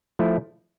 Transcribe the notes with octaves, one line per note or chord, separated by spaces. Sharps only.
F3 A3 E4